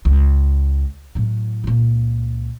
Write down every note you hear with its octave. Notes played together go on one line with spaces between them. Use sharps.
C#2
A2 F#3
C#2 A#2